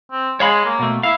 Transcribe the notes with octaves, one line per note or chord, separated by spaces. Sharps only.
C4
G#3 C#5 F5 B5
A#3
B2 A3
E4 F5